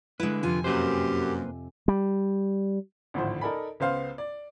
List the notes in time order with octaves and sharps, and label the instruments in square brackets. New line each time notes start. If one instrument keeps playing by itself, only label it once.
[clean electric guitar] D3 B4 [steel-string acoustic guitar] G#3 E4
[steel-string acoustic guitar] F2 C3 G#5 [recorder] F4
[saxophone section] F#2 [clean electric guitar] A#3 B4 C5 [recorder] G4
[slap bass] G3
[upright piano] G#1 D2 A2 F3 C5
D#4 A4 A#4 D5 G#5 B5
C#2 B3 C5 F5
D5